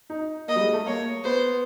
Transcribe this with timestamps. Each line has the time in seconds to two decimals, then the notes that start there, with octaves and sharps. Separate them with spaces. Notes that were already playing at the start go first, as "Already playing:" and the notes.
0.10 D#4
0.48 A#3 D#5
0.56 G3
0.61 G#3
0.73 A3
0.86 A#3 C#5
1.24 B3 C5